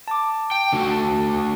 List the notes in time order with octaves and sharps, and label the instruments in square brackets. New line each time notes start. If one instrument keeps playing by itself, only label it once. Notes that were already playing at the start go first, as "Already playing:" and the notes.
[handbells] A5 D6
[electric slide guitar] G5
D3 A3 F#4
[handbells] A5